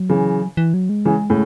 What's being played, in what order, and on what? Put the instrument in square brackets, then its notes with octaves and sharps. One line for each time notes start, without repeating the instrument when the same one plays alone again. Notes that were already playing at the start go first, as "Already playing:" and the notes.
Already playing: [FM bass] F#3
[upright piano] C#3 E3
[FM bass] E3
F#3
G#3
[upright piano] C#3 E3
A2 C#3